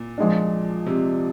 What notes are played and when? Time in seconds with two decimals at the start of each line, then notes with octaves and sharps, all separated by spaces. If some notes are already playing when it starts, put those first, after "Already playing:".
Already playing: A#2
0.18 F3 G#3 D4
0.87 C3